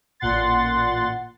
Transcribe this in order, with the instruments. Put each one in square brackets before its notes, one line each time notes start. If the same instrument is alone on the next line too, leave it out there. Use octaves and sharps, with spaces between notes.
[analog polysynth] A1 A#2 F#5 C6 A6